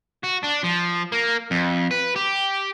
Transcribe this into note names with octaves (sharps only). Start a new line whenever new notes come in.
F#4
D4
F3
A#3
F2
B4
G4